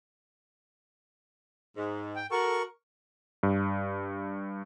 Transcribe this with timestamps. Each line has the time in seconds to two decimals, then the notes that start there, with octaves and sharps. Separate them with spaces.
1.77 G#2
2.16 G5
2.31 F#4 A4 A#4 C#6
3.43 G2